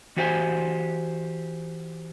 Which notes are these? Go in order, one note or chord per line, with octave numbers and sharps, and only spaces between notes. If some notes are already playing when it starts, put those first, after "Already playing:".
E3 F#4 G4 C5 G5 G#5